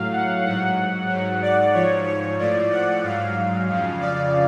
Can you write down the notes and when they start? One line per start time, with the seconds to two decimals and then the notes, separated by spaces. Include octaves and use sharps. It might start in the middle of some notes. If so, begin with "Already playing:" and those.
Already playing: A2 F#3 F5
0.13 F#5
0.45 G#2 F#3 F#5
1.09 G#2 F#3
1.42 D5
1.74 G#2 F3 C#5
2.06 C#5
2.39 A2 F3 D5
2.71 F#5
3.03 G#2 F#3 F5
3.68 F2 C#3 F3
4.01 D5